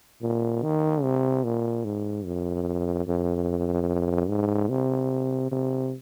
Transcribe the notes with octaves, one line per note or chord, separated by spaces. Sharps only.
A#2
D#3
C3
A#2
G#2
F2
F2
G#2
C3
C3